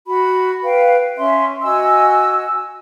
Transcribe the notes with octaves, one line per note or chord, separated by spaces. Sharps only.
F#4 B5
B4 F5 G5
C#4 E5 C6
F#4 D#5 G#5 E6